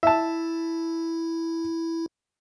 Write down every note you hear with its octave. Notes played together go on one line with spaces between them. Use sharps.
E4 E5 A5